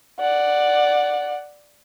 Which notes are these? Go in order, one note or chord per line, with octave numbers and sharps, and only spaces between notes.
D5 F#5